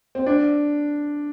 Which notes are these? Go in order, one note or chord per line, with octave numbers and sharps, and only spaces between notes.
C4
D4